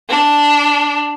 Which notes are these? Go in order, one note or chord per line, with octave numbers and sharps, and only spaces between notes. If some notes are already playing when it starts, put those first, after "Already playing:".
D4